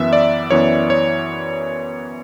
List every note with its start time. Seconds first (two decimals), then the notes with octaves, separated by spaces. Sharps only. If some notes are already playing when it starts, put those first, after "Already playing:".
Already playing: F#2 E3 B3 E5
0.13 D5
0.51 F#2 E3 B3 C#5
0.90 C#5